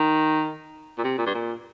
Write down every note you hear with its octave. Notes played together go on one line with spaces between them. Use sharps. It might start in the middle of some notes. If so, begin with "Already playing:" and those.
Already playing: D#3
A#2
C3
A#2
G2
A#2